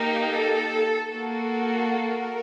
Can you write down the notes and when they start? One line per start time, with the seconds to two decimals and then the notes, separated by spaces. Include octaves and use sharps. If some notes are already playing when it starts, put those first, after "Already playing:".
Already playing: A#3 D#4 G4 A#4
0.31 A4
1.11 A#3 F#4 A4
1.93 A#4